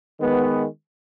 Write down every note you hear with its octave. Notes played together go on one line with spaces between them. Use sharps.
D#3 G#3 B3